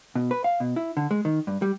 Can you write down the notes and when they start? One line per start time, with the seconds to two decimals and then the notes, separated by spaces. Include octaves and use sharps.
0.15 B2
0.31 B4
0.44 F5
0.60 B2
0.76 E4
0.97 D3
1.11 G#3
1.25 D#3
1.47 G2
1.62 G3